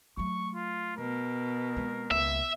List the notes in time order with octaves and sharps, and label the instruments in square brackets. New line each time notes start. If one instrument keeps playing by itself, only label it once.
[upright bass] F#3 A3 [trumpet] C#6
[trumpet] F4
[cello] B2 [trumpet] A#4
[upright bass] G#3 C4
[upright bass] C#2 A#3 [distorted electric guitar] E5